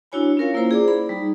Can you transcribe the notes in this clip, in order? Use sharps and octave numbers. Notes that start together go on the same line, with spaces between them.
D4 E4 F#4 C#5 G#5 B5
C#4 F4 A#4 C#5 F5
A#3 E4 F4 C5 A#5
G#4 D5 D6
B5
G3 D#4